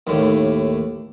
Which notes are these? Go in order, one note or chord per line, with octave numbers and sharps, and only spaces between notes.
D#2 A2